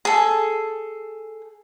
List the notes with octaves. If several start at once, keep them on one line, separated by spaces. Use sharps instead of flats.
G#4 A4